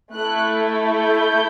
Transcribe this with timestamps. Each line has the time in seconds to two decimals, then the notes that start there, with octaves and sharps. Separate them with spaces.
0.15 A3 E4 A4 F#6
1.01 G6